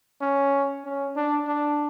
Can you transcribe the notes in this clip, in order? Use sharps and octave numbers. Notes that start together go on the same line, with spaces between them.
C#4
C#4
D4
D4